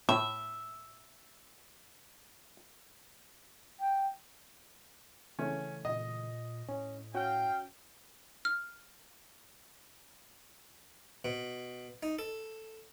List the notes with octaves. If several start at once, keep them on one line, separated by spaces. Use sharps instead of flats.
A2 E5
G5
C#3 E3 A3 C#4
A#2 D#5
A2 C#4
C#4 F#4 F5 G5
F6
B2
D#4
A4